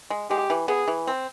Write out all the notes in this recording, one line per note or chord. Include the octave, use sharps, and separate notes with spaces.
G#3
G#3 G4
E3
B3 G#4
E3
C4